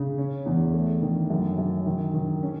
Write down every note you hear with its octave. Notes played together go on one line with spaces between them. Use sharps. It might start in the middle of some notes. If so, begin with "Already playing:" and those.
Already playing: C#3
C#4
E2
A3
D#3
F#2
F#2
D#3
D#3
C#4